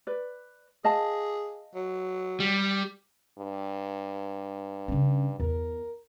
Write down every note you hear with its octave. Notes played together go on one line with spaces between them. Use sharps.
B4 D5
G#4 D#5 F5 A5
F#3
G3
G2
C#3 C#4
E2 A#4